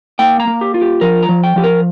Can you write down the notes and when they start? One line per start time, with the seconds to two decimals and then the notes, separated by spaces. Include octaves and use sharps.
0.19 A#3 G5
0.40 A#5
0.47 A#3
0.61 G4
0.74 F4
0.81 G4
1.01 F3 A#4
1.23 A#5
1.29 F3
1.44 G5
1.56 F3 G4
1.64 A#4